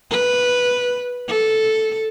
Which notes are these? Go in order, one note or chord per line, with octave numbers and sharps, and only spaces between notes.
B4
A4